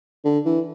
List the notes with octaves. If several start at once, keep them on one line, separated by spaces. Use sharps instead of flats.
D3
E3